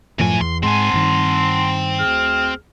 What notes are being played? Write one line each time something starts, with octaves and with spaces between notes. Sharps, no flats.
F#2 A2 E3 F3 G#5
E2 C6
G#2 C4 F#5 G#5 A5 C6
G2 D#3
D2 G#4 F6